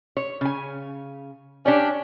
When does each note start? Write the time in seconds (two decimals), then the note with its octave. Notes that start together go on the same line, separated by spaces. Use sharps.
0.17 C#5
0.41 C#3 G#5
1.66 C#4 D4 G4 C#5 D5